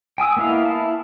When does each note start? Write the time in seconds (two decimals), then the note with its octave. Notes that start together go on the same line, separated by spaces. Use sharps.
0.18 G5 G#5 D#6 E6
0.37 A#3 B3 E4 D#5 F5
0.65 E4 A5